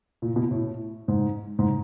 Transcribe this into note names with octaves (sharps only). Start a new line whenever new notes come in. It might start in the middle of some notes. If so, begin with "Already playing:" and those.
A#2
B2
A2
G#2
G#2